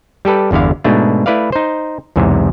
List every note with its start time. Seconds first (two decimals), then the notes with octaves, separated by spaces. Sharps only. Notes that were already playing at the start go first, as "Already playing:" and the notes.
0.25 G3 G4 A4 B4
0.51 G1 E2 D3 E4 F5
0.84 G#2 B2 A3 D4
1.26 A3 E4 B4 D5 F5
1.52 D#4 C5
2.16 B1 E2 G#2 C3